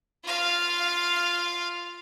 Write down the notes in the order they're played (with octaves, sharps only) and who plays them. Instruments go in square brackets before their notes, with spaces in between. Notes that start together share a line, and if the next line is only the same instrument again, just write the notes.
[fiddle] F4 F5